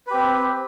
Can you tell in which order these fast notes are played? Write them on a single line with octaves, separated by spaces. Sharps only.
B4 G4 C4